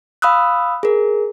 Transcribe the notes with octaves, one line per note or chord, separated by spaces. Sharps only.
F5 B5 D#6 E6 F#6
G#4 A#4